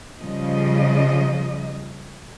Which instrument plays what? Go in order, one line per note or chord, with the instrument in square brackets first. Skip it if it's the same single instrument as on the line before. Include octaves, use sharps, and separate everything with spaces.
[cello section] C#3 F3 G3 D#5